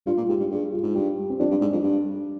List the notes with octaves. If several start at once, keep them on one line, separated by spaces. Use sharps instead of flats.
G2 F4
A#2
G#2 G4
G2
G2 G#4
F4
G#2
G2 G4
C4
F2 D4
G2
G#2
F2
G2